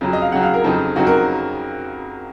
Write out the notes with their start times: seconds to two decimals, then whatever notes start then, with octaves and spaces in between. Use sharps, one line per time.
0.01 F2 C#3 F#3
0.13 D#5
0.21 F5
0.32 F2 C#3 F#3 F#5
0.43 F5
0.54 A#4
0.64 F2 C#3 F#3 C4 D#4 A4
0.96 F2 C#3 F#3 C4 D#4 F#4
1.07 A#4